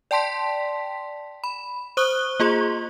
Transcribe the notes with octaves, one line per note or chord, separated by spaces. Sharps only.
D5 G5 A5 C6 B6
B5
C5 C#6 D#6 F#6 G7
A#3 F4 G#4 C6